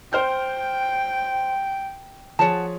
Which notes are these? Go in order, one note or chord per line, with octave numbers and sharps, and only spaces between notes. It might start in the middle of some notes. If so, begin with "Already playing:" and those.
C5 G5 F6 G6
F3 G#4 C#5 F#5 A5